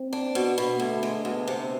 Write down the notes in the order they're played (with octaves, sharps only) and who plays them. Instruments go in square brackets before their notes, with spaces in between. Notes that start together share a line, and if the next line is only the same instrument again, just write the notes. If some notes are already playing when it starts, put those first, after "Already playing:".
Already playing: [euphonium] C4
[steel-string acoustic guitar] D4
[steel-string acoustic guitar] B2 [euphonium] B3
[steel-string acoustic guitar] B2
[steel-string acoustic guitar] D2 [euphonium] A3
[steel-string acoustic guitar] G#3
[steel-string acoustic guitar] D2 [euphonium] B3
[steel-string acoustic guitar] C3